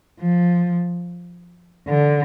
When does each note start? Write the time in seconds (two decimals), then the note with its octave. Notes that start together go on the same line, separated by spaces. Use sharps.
0.21 F3
1.88 D3